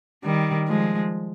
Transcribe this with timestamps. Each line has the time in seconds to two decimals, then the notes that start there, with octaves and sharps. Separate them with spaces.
0.24 D#3 G3
0.68 F3 G#3